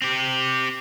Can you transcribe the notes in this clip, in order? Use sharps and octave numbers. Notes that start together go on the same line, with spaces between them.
C4 G4